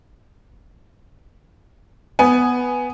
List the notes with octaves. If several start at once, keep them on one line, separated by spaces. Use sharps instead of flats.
B3 G#5